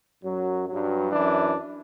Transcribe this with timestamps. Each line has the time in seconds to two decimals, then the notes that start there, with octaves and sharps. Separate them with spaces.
0.23 F#2 F#3
0.68 G2 F#3
1.11 F#2 E3 D4